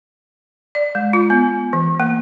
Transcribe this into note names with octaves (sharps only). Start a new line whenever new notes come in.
D5
G#3
F4
B3
E3
A#3